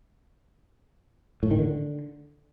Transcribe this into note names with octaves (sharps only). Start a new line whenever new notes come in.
A2
D#3
D3